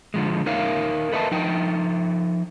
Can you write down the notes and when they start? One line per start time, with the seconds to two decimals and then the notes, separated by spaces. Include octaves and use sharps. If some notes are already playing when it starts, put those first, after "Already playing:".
0.14 D3 F3 G#3
0.46 D#4 A#4 C#5 E5 F5
1.12 A4 B4 D#5 E5 A5
1.31 F3 D#4 G5